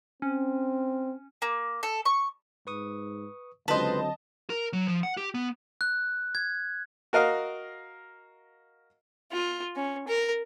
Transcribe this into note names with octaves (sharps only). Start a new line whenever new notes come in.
C4 C#4
A#3
A4
C#6
G#2 B4 C#6 D#6
C#2 D3 F#3 C4 B4 C5 D#5 A5
A#4
F#3
F3
F#5
G4
B3
F#6
G#6
F#4 A#4 D#5 F5
F4
C#4
A#4